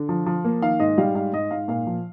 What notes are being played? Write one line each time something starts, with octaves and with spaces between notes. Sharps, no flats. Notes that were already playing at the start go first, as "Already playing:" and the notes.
Already playing: D3
F3
F3
A#3
D#3 F5
G#2 D#5
G3 F5
G#2 F5
G#2 D#5
G#2 F5
A#2 F5
F3